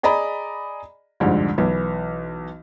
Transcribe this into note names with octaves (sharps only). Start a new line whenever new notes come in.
G#4 D5 D#5 A#5 B5
C2 F2 G#2 D3
B1 E3